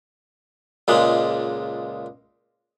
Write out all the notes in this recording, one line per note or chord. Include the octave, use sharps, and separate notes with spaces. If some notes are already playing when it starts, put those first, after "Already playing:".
C#2 A#2 G#3